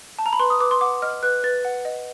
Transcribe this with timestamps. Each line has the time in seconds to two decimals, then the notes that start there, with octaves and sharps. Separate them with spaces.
0.19 A5
0.26 A#5
0.33 B5
0.39 B4 C6
0.50 D#6
0.60 B4 D6
0.71 C6
0.81 F#5 D6
1.02 D#5 F6
1.23 B4 F#6
1.44 B4 A6
1.65 F#5
1.85 D#5